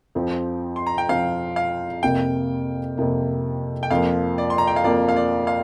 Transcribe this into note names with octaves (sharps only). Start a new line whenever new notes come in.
F2 F3 C4
C6
A#5
G5
F2 F3 C4 F5
F5
F2 C3 A#3 G5
F2 C3 A#3
G5
F2 F3 A#3 F5
D5
C6
A#5
G5
F5
F2 F3 A#3 D5
F5
D5
F5